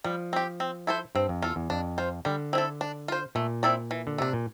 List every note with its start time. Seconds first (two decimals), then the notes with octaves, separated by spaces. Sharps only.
0.04 F3 G3
0.33 C4 G4
0.60 C4
0.87 E4 A4 C5
1.15 G2 C4
1.29 F2
1.42 E2 F4 A4
1.56 E2
1.70 F2 D4
1.98 F4 C5
2.25 D3 G3
2.53 C4 E4 A4
2.81 D4
3.08 F4 C5
3.35 A#2 A3
3.63 C4 E4 A4 D5
3.91 E3
4.07 D3
4.18 C3 A3 D4
4.33 A#2